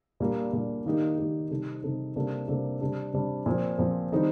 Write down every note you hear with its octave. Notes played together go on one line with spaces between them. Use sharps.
A#2 G3 A#3 D4
A#2 G3 A#3 D4
D#3 A#3 D#4 G4
D#3 A#3 D#4 G4
C3 G3 C4 D#4 A4
C3 G3 C4 D#4 A4
C3 G3 A#3 D4 A4
C3 G3 A#3 D4 A4
C3 G3 D4
C3 G3 D4
A#2 F3 C4
A#2 F3 C4
D#3 G3 C4 D#4 A4